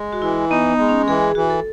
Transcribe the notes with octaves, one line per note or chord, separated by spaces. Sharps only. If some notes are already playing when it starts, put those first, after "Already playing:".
Already playing: G#3
F#4
E3 E4
B3 D#4
B3
G#3
C#4
E3 G#4
G#4
E3 F#4
A4